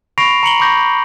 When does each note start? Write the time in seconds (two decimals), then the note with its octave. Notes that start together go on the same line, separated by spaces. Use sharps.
0.18 B5 C#6 A#6 C7 D7 F7
0.43 A#5 C#7 F#7 G7
0.60 B5 C#6 D6 G6 A#6